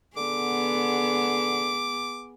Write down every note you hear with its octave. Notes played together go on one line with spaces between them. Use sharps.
D3 B3 G#4 D6